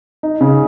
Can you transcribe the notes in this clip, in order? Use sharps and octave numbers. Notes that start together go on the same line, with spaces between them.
D#4
C#3